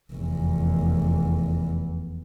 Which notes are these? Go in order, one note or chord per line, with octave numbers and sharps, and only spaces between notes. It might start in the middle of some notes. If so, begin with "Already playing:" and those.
F1 E2